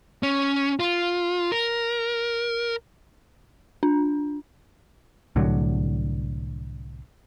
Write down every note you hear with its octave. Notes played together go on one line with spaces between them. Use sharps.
C#4
F4
A#4
D4
C2 A2 D3 F#3